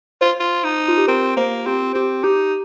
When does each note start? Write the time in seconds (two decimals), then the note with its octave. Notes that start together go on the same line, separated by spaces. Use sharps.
0.21 F4 C5
0.40 F4
0.64 D#4
0.88 F4
0.98 G4
1.08 C4 A#4
1.37 A#3 C5
1.66 C4 G4
1.95 C4 G4
2.24 D#4 G4